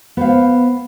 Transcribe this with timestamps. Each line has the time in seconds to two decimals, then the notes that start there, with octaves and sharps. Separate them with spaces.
0.17 B3 C5 F5